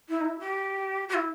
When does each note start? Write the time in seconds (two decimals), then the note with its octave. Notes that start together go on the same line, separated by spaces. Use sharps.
0.08 E4
0.20 D#4
0.24 E4
0.39 G4
1.08 G4
1.14 E4